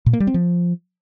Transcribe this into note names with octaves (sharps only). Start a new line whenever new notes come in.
A#2
A#3
G3
C4
F3